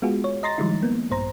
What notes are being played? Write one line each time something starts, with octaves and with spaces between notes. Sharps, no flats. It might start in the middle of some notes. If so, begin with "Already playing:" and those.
G#3 B3 F4 F#4 G#4
C#5
D#5 A#5 C6 A6 A#6
D#3 F3 G3 G#3 D#4 E4
A#3 B3
A#1 G2 C5 A#5